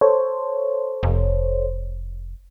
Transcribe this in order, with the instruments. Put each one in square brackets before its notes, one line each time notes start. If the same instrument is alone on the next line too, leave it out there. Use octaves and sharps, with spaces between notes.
[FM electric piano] A4 C5 C#5
[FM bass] F1